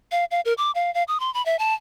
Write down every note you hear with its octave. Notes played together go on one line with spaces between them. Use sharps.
F5
F5
A#4
D6
F5
F5
D#6
C6
B5
E5
A5